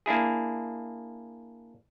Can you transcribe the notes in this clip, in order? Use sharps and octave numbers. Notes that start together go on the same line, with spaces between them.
A#3 D4 E4 G#4